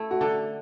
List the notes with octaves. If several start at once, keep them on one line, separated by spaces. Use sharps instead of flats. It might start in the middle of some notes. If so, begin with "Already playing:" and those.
Already playing: A3 E4
F#4
D3 A4